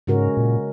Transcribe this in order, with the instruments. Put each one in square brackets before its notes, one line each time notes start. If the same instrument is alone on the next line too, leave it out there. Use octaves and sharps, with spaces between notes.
[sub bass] G#2 [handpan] C#3 G#3 C#4 F#4 A#4
[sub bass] A#2